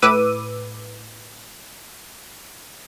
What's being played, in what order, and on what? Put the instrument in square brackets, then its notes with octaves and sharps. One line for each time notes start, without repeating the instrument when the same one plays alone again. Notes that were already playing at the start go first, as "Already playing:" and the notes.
[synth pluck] A2 B4 D6 E6 D#7